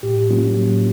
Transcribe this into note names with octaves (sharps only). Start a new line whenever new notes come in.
A2 G4
F#3 A#3 C#4 F4
A2